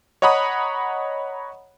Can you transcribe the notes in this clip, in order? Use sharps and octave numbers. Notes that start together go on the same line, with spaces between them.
C#5 D#5 F#5 A#5 B5 D#6